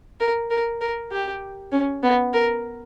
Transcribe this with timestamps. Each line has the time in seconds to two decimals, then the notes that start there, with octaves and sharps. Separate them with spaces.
0.20 A#4
0.51 A#4
0.81 A#4
1.12 G4
1.72 C#4
2.03 B3
2.34 A#4